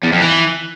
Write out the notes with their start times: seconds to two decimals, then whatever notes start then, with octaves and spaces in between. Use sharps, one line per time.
0.04 E2
0.13 F2
0.21 E3